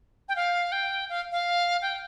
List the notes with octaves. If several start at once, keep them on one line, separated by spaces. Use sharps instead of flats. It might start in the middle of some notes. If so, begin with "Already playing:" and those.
G5
F5
G5
F5
F5
G5